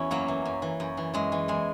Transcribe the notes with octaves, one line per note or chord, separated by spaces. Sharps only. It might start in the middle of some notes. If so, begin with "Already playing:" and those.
Already playing: E2 C#4 E4 F#4
F#2 F#3 A#3
E3
F#2
E3
F#2
E3
F#2 G#3
E3
E2 G#3